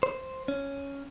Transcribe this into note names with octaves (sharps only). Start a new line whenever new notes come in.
C5
C#4